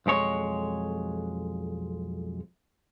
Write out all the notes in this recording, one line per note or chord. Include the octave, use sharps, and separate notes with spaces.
B1 F2 G#3 C#5